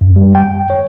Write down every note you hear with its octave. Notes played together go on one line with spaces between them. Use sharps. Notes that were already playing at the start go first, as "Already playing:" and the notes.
F#2
G3
G5
C#5